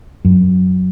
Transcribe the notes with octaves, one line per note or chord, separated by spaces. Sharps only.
F#2